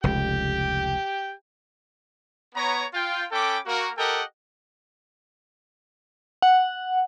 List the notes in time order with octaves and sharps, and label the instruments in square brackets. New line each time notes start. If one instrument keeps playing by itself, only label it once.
[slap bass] F1 C#2 [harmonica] G4 G5
[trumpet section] B3 C#5 A#5
F4 G5
C#4 A4 G5 B5 D6
A#3 F#4 A#4
G4 A4 A#4 D#5 F#5 G5
[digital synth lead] F#5